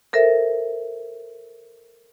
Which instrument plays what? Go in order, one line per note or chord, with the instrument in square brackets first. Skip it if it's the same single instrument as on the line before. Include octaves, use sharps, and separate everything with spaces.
[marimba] A4 A#4 C5 E5